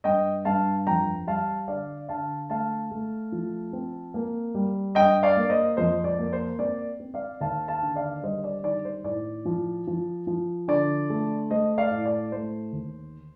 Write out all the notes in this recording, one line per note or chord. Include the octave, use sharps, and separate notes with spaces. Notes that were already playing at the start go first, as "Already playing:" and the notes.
G2 D#5 G5
G2 F5 A5
F2 G5 A#5
G3 F5 A5
D3 D5 F5
D3 F5 A5
A3 F5 A5
A3
F3
C4
A#3
G3
G2 D#5 G5
D5 F5
A#3
C5 D#5
F2 C5 D#5
D5
A#3
C5
C4 D5
C4
D5 F5
D#2 F5 A5
F5 A5
D3
D5 F5
G3 C5 D#5
D5
D#3 D5
C5
A2 D5
F3
F3
F3
D3 D5
A3
A3 C5 D#5
D5 F5
A2
D5
A3 C5
D#2